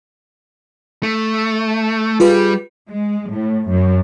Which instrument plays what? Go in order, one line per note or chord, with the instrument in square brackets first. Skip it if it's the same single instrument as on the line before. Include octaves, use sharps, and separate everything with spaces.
[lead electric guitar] A3
[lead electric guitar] G3 [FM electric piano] F4 G#4 B4
[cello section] G#3
A2
F#2